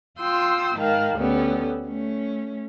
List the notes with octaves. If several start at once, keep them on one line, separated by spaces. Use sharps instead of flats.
F4 G5 C6 D#6 E6
G#2 D#3 A#4 F5 A5
D2 G3 B3 C#4 A4
A3 C#4